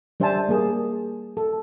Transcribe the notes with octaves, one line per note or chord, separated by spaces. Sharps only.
G3 D4 C5 E5 G#5 A5
A#3 G#4
A4